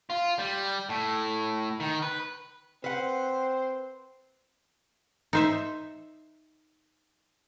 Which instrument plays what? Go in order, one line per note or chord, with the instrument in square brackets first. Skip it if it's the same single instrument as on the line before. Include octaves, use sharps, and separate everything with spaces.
[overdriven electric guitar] F4
G3
A2
D#3
B4
[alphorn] C4 [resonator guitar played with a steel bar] B4 F#5 [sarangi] C5
[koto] D#4 C5 E5